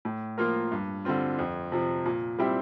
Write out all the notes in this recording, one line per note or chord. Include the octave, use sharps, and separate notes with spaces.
A2
F3 A#3 F4 A#4
G2
D3 G3 C4 F4
F2
C3 F3
A#2
G3 C4 E4 G4